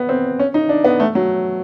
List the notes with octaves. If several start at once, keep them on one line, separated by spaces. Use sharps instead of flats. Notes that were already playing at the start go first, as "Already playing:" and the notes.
Already playing: B3
C4
C#4
D#4
D4
B3
A3
F#3